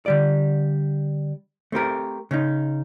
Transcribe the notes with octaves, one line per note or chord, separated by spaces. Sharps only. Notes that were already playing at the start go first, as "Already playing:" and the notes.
D3 G3 D5
A3 C4 G4 A#4
C#3 C#4 D#4